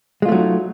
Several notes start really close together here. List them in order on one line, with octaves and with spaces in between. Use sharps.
G#3 F4 A3 F#3 D#4